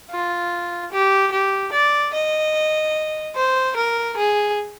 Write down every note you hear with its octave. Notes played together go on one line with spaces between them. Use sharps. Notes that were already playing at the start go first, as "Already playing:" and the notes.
F4
G4
G4
D5
D#5
C5
A#4
G#4